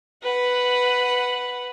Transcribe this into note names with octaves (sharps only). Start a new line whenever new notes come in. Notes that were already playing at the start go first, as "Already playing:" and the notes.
B4 F#5